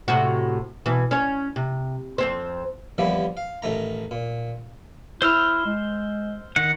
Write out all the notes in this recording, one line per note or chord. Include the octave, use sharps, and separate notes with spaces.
A2 C3 F#4
B2 E3
C#4 C#5
C3
F2 C4 C5
D#2 E3 F3 G3 A#3 B3
F5
A1 D#3 A3 A#5
A#2
E4 C5 E6 F6
G#3
D#3 F#5